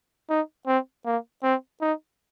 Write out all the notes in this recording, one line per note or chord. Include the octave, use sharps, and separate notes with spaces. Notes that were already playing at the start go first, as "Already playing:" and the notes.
D#4
C4
A#3
C4
D#4